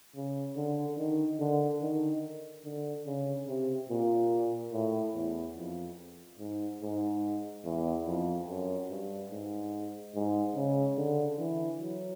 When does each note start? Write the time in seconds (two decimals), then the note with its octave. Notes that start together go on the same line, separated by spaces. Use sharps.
0.15 C#3
0.56 D3
0.98 D#3
1.40 D3
1.82 D#3
2.65 D3
3.06 C#3
3.48 C3
3.89 A#2
4.73 A2
5.15 E2
5.57 F2
6.39 G#2
6.81 G#2
7.64 E2
8.06 F2
8.48 F#2
8.90 G2
9.31 G#2
10.15 G#2
10.55 C#3
10.98 D3
11.39 E3
11.80 F#3